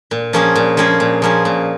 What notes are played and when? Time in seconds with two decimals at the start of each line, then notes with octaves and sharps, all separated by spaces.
0.11 A#2
0.33 F3 A#3 C#4 G#4
0.55 A#2
0.77 F3 A#3 C#4 G#4
1.00 A#2
1.22 F3 A#3 C#4 G#4
1.45 A#2